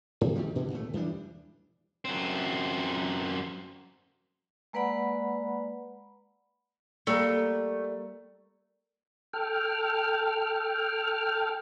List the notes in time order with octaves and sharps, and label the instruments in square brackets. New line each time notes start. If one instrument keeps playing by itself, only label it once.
[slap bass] G2
D#3 F3 G3
A#2 D3 E3
D1 G#1 A#2 A3
D#2 E3 G3 D4
[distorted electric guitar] F#2 C4
[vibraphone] G#3 A#3 B4 D5 F#5 B5
[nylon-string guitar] G3 [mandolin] A3 [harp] A#3 A#4
[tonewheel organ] A4 G5 F6